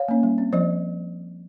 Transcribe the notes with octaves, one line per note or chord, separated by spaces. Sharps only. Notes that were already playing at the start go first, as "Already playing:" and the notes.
Already playing: C#5 F5
A#3 C#4
G3
C4
F3 C5 D#5